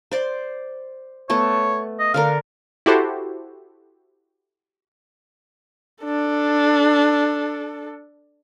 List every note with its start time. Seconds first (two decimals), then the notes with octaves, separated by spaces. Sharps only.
0.11 C5 D5 C6
1.30 A3 B3 C#5 A5
1.99 D#5
2.14 D3 D4 A#4 F5
2.86 E4 F#4 G4 A4 C5
6.04 D4 A4